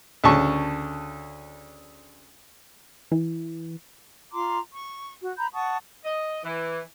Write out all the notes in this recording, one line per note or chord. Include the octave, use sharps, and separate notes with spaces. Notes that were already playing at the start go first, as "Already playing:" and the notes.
D2 C#3 A5 C#6
E3
F4 A#5 C6 D6
C#6
F#4
A#5 B5 G6
F#5 A5 C#6 D#6
D#5
E3